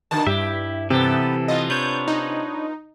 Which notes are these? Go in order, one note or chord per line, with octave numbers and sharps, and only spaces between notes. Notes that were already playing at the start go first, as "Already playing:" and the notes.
B2 D3 D#3 A5
G2 E4 G4 E5
C3 E3 B3 G4 A4
B3 F4 D#5
D4 B4 C#5 G6
D#4